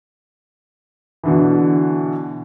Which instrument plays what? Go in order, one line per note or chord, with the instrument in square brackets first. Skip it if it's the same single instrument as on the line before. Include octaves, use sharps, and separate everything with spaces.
[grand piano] B2 D3 E3